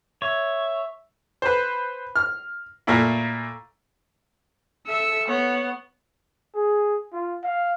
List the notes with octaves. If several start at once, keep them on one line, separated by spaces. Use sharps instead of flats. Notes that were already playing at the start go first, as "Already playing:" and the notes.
C#5 E5
B4 C5
F6
A#2 A3 A#3 E4
A4 E5 E6 C#7
B3 C#5
G#4
F4
F5